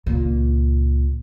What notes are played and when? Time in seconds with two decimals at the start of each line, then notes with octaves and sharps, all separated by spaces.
0.06 C#2 A#2